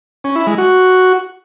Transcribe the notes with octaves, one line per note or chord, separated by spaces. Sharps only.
C#4
E4
G#3
F#4